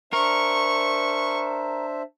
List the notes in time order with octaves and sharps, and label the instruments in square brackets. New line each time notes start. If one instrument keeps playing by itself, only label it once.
[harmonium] D4 C5 E5 [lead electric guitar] A#4 [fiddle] C#6